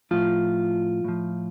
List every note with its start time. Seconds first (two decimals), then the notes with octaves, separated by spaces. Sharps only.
0.11 A2 F3 F4
1.04 A2 F3